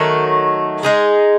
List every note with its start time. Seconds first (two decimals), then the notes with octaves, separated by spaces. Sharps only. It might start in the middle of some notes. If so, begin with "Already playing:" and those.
Already playing: D#3 F#3 A3
0.83 G#3 D#4 G#4